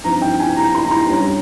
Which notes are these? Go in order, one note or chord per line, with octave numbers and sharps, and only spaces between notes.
G2 F3 C4 D#4 A#5
G5
G#5
A#5
C6
A#5
C6
G2 G3 C#4 A#5